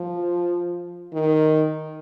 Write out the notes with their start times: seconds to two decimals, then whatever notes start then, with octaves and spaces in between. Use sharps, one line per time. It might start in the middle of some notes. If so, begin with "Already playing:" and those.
Already playing: F3
1.13 D#3